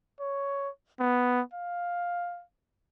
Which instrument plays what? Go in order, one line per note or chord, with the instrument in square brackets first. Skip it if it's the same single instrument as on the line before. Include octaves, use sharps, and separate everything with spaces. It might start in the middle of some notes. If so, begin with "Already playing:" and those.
[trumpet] C#5
B3
F5